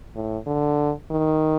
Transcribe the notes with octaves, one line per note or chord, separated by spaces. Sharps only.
A2
D3
D#3